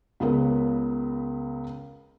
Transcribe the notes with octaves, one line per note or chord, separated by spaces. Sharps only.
C#2 C#3 B3 A#4